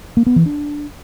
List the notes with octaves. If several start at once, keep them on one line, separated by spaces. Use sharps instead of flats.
A#3
B3
E3
D4